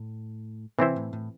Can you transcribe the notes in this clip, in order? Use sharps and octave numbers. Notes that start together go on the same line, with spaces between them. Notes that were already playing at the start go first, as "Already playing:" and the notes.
Already playing: A2
C3 E3 C4 E4 C5
A2
A2